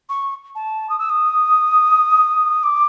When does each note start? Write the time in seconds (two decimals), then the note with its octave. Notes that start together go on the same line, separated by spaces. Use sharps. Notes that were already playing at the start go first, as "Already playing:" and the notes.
0.09 C#6
0.55 A5
0.89 D#6
0.99 E6
1.09 D#6
2.63 D6